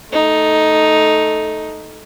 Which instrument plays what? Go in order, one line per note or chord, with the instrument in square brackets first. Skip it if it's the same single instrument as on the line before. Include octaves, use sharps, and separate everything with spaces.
[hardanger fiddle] A3 D#4